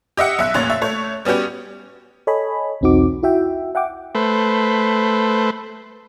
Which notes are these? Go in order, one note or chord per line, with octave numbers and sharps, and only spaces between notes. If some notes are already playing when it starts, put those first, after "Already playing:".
G4 D#5 E5 F#5
B1 E5 F#6
F1 A#2 C#5 A6
E5
A3 C#5
G3 B3 C#4 F#4 G4
A4 C#5 D#5 G#5 B5
B1 E2 C4 D#4 F#4 D6
E4 F#4 E5 G5
E5 F#5 G5 D6
A3 B4 C5